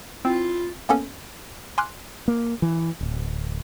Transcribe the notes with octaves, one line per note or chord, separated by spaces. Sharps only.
C4 E4 F4
A#3 B3 C#4 A4
G#5 C6 D6 F6 F#6
A#3
E3
D1